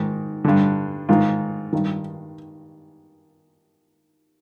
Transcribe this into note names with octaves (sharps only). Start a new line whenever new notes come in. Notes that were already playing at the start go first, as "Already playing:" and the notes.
Already playing: G#2 D#3
G2 D3
G#2 D#3 F4
G2 D#3